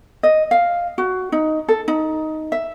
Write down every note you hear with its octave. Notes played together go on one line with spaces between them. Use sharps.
D#5
F5
F#4
D#4
A4
D#4
E5